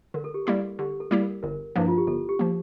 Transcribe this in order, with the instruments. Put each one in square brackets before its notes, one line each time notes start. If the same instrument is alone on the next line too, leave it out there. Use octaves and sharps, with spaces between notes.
[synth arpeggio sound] D3 [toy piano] A#4
[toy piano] A4
G4
[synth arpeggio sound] G3 A#3 E4 G4 [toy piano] A4
[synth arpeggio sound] D3 [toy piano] G4
[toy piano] A4
[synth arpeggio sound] G3 A#3 E4 G4
[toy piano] A#4
[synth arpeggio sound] G1 [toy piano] A#4
[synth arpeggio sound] G2 F3 A#3 [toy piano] E4
[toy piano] F4
G4
[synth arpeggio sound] G1 [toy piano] A4
[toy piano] G4
[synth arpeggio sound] F3 A#3